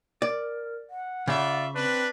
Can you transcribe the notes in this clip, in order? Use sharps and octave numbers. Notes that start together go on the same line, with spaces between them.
A#4 D5
F#5
C#3 F4 D5 E5
C4 D4 B4